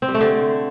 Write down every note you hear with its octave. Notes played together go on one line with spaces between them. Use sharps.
C4
G3
A3
D3